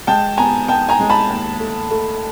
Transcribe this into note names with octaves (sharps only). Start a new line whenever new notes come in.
G#3 G5 A5
B3 G#5 A#5
B3 G5 A5
G#5 A#5
G#3
A5 B5
D#2
A3
A3